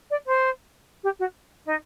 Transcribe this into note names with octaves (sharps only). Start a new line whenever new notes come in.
D5
C5
G4
F#4
D#4